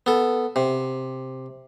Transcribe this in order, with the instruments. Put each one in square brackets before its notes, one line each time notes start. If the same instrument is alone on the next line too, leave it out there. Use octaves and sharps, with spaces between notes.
[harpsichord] B3 A4
C3